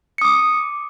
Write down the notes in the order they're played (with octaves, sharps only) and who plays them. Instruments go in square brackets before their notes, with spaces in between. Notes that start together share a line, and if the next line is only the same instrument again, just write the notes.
[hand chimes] C#7
D#6
D6